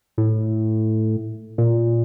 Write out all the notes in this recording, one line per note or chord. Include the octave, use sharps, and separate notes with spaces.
A2
A#2